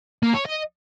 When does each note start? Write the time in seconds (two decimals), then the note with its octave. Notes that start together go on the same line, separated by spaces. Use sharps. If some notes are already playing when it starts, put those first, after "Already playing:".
0.23 A#3
0.34 C#5
0.46 D#5